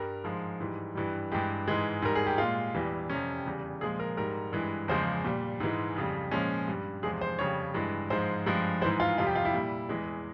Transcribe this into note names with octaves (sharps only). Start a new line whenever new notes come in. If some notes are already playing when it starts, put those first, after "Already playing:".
Already playing: G2 G3 A#4
G#2 F3 G#3
G#2 E3 G3
G2 E3 G3
G2 E3 G#3 G4
G#2 E3 G#3
G#2 G3 A#4
G#4
G4
A#2 G#3 F4
E2 E3 G3
F2 C3 G3 C#4
E2 C#3 G3
A#2 F3 G#3 G#4
A#4
G#2 G3 A#4
G2 E3 G#3
E2 C#3 F3 G#3 C5
A#2 G3
G#2 E3 G#3
F2 C#3 G3
A#2 F3 G#3 C#4
G2 G3
E2 C3 F3 G#3 G#4
C5
F2 C#3 G3 C#5
G2 E3 G#3
G#2 F3 G#3 C5
G2 F3 G#3
G#2 E3 G#3 C5
F4
F2 C3 G3 F4
G4
F4
E4
A#2 G3
E2 E3 G#3